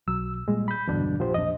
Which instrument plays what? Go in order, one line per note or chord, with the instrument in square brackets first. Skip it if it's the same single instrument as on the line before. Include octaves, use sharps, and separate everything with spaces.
[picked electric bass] B1 F#3 [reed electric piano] E6
[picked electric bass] A#2 G3 [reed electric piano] G#3
[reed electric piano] B5 G6
[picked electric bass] B1 E2 G2 [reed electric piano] B2 D3 D4
[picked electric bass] A#1 [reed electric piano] F3 G4 C5
[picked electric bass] E1 A#1 D4 [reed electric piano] D#5